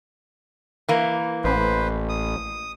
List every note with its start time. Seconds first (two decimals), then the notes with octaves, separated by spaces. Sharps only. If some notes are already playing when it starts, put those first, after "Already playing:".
0.89 E3 A#3
1.44 A1 B4 C5
2.09 D#6